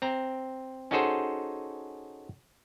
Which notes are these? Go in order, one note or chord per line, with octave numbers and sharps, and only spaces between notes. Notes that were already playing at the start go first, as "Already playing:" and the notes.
C4 A#5
C#4 D#4 F#4 G#4 A4 C5